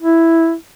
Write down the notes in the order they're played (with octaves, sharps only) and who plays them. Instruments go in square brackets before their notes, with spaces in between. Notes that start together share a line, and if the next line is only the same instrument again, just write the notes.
[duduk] E4